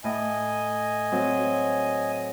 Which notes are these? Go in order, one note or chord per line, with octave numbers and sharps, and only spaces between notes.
A2 D#5 G#5
F#3 C4